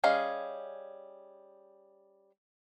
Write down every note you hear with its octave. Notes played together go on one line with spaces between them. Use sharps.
G3 C#4 G#4 D#5 F5